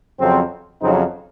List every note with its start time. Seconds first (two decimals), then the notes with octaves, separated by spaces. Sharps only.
0.20 F2 C#3 F#3 C4
0.81 F2 C#3 F#3 C4 D#4